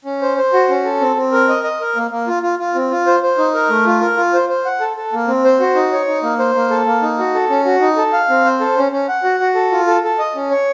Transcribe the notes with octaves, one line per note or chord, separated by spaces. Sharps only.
C#4
C5
C5
F#4
C#4
A4
C4
C4
A#4
D#5
D#5
A#4
A#3
A#3
F4
F4
F4
C4
F4
C5
C5
D#4
A#4
A3
F4
A#4
F4
C5
C5
F#5
A4
A4
A#3
C4
C5
F#4
D#4
C#5
D#4
A#3
C5
A#3
A4
A#3
D#4
F#4
A4
C#4
F#4
D#4
A4
F5
C4
C5
A4
C#4
C#4
F#5
F#4
F#4
A4
F4
A4
A4
D#5
C#4
C#5